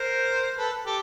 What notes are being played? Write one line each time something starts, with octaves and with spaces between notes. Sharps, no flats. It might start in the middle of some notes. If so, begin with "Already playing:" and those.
Already playing: A#4 C5
A4 B4
G4 A4